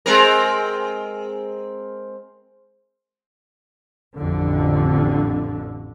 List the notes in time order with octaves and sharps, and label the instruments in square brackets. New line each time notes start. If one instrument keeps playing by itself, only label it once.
[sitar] G#3 C4 A#4
[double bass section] A1 F2 D3